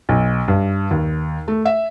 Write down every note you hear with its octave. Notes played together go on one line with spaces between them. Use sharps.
B1
G2
D#2
A3
E5